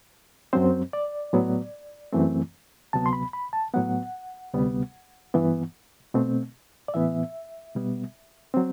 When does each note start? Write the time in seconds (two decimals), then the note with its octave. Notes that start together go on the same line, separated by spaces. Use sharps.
0.53 F#2 F#3 C4 C5
0.93 D5
1.33 A2 F#3 B3
2.13 F#2 E3 A3 C4
2.93 D2 C3 F#3 B3 A5
3.06 C6
3.13 B5
3.33 B5
3.53 A5
3.74 A2 F#3 B3 F#5
4.53 D2 C3 G3 B3
5.34 G2 E3 B3
6.14 B2 A3 C4
6.88 D5
6.94 A2 E3 B3 E5
7.75 B2 G3 B3
8.54 F#3 C4